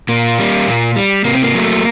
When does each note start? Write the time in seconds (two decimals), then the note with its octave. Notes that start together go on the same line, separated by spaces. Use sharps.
0.09 A#2 A#3
0.39 G3
0.67 A#2
0.96 G3
1.25 C3 A#3
1.34 C4
1.42 A#3
1.54 F#3 A3